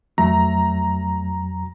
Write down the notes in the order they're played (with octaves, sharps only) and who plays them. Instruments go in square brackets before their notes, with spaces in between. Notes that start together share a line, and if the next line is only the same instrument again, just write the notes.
[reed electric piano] F2 F#3 [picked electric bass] A3 [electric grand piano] A#5